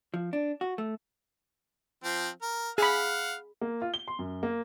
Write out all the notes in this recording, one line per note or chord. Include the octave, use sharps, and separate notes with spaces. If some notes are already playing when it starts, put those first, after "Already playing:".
F3
D4
F#4
A3
F3 C4
A#4
G#4 F5 F#5 B5
A#3
F4
G7
C6
F#2
A#3